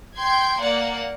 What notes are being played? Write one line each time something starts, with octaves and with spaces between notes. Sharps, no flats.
G5 C6 G6 G#6
A#3 D5 F#5